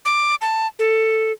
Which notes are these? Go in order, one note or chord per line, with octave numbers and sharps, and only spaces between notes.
D6
A5
A4